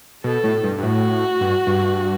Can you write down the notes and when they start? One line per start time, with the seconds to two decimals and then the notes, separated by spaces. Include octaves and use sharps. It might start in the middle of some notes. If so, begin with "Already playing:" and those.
0.24 B2 A4
0.44 A2
0.64 G2
0.78 G2
0.83 A2 F#4
1.41 G2
1.67 G2